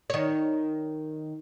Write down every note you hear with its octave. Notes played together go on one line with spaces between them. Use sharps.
D#3 C#5